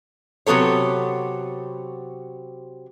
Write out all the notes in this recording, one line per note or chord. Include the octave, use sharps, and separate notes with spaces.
C3 F#3 B3 A4 C#5